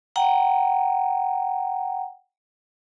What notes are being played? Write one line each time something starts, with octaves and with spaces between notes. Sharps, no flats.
F#5 G5 A#5